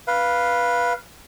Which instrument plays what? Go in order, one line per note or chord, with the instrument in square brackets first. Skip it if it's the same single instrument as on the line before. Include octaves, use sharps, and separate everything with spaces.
[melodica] B4 F5